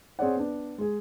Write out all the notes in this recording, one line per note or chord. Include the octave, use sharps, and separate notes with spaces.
C4 G#4 C#5 D5 F#5
B3 D4
G#3 G#4